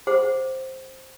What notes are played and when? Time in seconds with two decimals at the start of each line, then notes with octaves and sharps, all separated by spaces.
0.07 G#4 C5 F#5